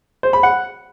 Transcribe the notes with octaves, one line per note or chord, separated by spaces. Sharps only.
C5
B5
F#5